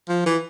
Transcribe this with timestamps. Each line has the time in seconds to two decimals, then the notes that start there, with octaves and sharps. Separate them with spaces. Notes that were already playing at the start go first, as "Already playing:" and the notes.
0.09 F3
0.26 E3